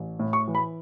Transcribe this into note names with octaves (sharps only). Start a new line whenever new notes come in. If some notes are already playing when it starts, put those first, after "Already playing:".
Already playing: A1
A2
C#6
E3
B5